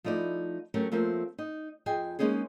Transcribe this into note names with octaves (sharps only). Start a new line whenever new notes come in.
F3 A3 D#4 E4 D5
F#3 A3 C#4 G4 A#4
F3 A3 A#3 C4 A#4
D#4
F2 G#4 D#5 G5 G#5
G#3 A#3 C#4 D#4 G#4